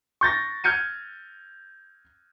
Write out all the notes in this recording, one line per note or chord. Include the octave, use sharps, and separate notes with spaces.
C#6 G6 A6 A#6
F6 G6 G#6 C#7 D#7